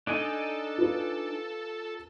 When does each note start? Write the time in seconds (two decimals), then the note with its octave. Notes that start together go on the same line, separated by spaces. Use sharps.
0.07 D4 D#4 A4 G#5
0.78 F4 B4